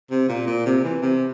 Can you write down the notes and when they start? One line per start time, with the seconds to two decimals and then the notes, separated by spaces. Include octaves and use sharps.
0.11 C3
0.29 A#2
0.47 A#2
0.66 C3
0.84 E3
1.02 C3